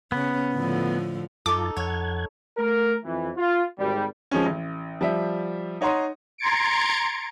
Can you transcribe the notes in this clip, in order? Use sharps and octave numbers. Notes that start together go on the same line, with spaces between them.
C#3 B3 C#4
A2 D3 F3
F#2 D#4 F4 A4 A5 D6
F2 C#5 F#5 G#6
A3 A#4
F2 E3
F4
G#1 G3
F3 G#3 C#4
A1
F3 G3 E5
D#4 C#5 F#5 A#5 C6 D#6
A#5 C6 G#6 A6 C#7 D7